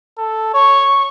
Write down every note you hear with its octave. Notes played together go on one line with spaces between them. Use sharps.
A4
C#5 C#6